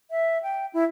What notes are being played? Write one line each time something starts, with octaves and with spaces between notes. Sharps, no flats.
E5
G5
E4